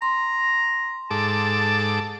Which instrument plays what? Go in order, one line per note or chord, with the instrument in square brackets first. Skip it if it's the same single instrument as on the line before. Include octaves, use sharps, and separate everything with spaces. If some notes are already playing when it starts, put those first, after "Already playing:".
[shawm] A#5 [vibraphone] C6
[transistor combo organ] G#2 A4 D6 [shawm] A5